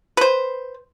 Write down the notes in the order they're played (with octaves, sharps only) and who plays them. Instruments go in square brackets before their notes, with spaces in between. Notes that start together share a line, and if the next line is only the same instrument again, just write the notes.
[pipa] B4 C5